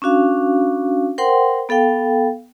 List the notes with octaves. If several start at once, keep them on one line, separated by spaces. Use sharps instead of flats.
C#4 D4 F#4 F5
A#4 C5 F#5 G5 C6
B3 A4 F5 G5